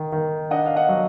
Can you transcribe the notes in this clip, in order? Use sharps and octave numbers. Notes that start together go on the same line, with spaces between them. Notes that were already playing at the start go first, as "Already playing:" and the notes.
Already playing: D#3
D#3
D4 D#5 F#5
F5
D#5 F#5
F#3